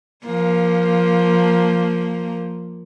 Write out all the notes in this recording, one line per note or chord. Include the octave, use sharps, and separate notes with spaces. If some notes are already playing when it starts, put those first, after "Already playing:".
F3 A#3